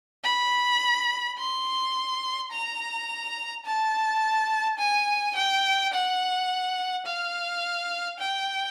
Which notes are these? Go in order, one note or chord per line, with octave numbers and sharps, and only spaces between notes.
B5
C6
A#5
A5
G#5
G5
F#5
F5
G5